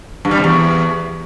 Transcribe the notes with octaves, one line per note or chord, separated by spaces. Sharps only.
G2
G3
C3
E2